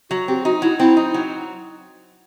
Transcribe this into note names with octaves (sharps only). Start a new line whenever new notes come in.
F#3 F#4
C4 G4
G4
D#4 F#4
F#3 E4
C4 E4
D#4
F#3